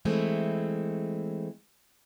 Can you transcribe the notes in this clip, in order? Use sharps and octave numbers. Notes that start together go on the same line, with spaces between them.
E3 G#3 A3 C4